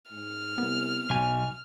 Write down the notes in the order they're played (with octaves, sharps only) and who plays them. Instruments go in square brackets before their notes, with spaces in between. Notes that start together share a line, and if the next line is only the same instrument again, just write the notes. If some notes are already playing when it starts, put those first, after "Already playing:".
[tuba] G#2 [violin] F6
[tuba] C2 [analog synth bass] B3
[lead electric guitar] B1 G#5 [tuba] F#3